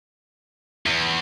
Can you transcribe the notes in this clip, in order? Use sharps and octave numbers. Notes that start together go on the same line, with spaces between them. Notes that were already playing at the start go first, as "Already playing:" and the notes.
E2